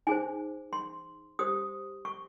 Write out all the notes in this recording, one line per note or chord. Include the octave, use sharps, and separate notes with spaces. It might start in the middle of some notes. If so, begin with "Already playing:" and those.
D#4 G#4 C5 G#5
C6
G4 C5 D#6
C#6